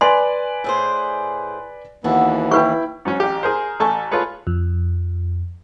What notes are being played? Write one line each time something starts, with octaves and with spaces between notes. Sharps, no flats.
B4 D5 G#5 C6
A2 G#4 C5
D#2 E3 B3 F#4 A4
E4 B4 G5 C#6
G#2 F#3 C#4
A1 G4
G#4 A#4 C5
A1 A3 A4 G#5 C#6
F4 G#4 A4 B4 C#5
F2